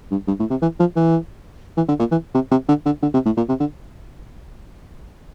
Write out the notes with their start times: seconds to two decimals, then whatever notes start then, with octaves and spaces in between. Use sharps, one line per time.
0.11 G2
0.27 G2
0.39 A2
0.50 C3
0.62 E3
0.79 F3
0.96 E3
1.77 E3
1.88 D3
1.99 A#2
2.11 E3
2.34 C3
2.51 C3
2.68 D3
2.86 D3
3.02 D3
3.14 C3
3.25 A2
3.37 A#2
3.49 C3
3.60 D3